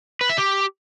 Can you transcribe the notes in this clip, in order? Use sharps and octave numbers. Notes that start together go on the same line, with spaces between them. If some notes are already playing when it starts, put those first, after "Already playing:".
B4
E5
G4